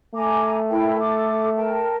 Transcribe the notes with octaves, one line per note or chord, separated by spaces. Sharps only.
A3 G#5 A#5 D6
E4 A#4 G5
A4 D6
A#4 G5 A5